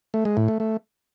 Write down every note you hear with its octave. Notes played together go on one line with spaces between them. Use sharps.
A3
G#3
A2
A3
A3